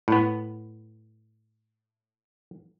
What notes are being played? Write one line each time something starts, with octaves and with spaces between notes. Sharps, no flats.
A2 B3